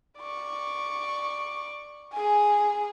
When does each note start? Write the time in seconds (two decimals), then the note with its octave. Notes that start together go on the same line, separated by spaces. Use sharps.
0.19 D5 C#6
2.13 G#4 G#5